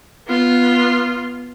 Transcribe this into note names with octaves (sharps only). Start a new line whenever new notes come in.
B3 F4